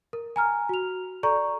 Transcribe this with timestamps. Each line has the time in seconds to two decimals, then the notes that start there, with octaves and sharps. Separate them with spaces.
0.13 A#4
0.36 G#5 A#5 F6
0.69 F#4 F7
1.23 A4 D5 A#5 C#6